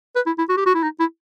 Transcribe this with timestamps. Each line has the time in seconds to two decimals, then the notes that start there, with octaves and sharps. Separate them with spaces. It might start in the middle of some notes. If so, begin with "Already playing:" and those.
0.16 B4
0.27 E4
0.38 E4
0.49 F#4
0.57 G4
0.66 F#4
0.75 E4
0.83 D#4
1.00 E4